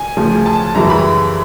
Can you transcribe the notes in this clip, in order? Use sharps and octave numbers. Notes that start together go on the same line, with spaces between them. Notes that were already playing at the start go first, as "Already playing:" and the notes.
Already playing: G#5
D2 C#3 F3
A5
F#2 C#3 E3 G3 A#5
B5